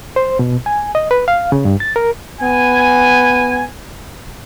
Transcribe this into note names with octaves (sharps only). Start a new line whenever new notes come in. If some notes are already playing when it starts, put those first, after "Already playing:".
C5
B2
G#5
D#5
B4
F5
C#3
G2
A6
A#4
B3 G#5